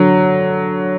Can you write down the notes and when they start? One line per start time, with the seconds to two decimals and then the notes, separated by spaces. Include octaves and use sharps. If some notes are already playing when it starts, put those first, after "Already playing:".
Already playing: D3 F#3